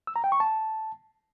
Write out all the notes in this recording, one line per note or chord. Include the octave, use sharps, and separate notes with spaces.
E6
A#5
G5
C#6
A5